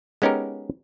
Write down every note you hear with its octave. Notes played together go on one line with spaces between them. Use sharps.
G#3 B3 C#4 D#4 G4 A#4